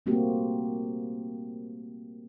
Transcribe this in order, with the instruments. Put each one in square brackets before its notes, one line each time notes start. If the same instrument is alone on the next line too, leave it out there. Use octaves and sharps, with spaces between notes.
[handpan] G3 A3 A#3 C4 F#4 G4